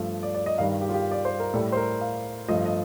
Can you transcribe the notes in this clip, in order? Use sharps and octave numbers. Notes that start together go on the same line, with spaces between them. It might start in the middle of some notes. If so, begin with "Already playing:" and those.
Already playing: G2 F3 A3
D5
D5
D#5
G2 D#3 G3 F5
G4
F4
G4
D5
C5
A#4
A2 G3 A4
C5
A#4
F5
G2 F3 A3 D#5
D#5